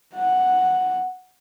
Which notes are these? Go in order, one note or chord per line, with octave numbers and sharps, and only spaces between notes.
F#5